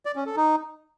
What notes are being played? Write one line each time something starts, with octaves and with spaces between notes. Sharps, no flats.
D5
C#4
A4
D#4